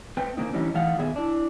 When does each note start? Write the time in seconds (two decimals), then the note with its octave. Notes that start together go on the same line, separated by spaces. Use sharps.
0.17 A3 C4 B4 G5
0.37 C#3 A#3 C4 D#4
0.53 D3 E3 G3 A3 C#4 D#4
0.74 E3 A3 D#4 F5 F#5
0.97 A#2 D#3 B3 G#4 E5
1.16 D4 E4